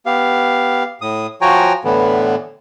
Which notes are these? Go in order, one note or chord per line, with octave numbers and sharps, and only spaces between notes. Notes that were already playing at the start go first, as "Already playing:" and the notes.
B3 G4 F5
A2 D#6
F3 F#4 C#5 G5 G#5 A#5
A2 D3 E3 B3